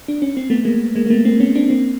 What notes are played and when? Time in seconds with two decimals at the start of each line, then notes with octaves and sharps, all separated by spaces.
0.08 D4
0.22 C#4
0.37 C4
0.50 A3 B3
0.65 G#3 A#3
0.95 G#3 A#3
1.06 A#3
1.10 A3 B3
1.25 A#3 C4
1.40 B3 C#4
1.55 C4 D4
1.70 A#3 C4